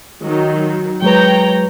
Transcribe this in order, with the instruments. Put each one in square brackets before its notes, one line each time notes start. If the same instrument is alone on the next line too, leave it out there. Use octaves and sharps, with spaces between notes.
[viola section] D#3 F#3
[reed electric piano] F#3 G#3 B4 [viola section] C#5 G5 A#5